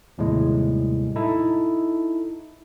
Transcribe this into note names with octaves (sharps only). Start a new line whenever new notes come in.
D#2 A2 C3 G3 G#3
D#4 E4 A4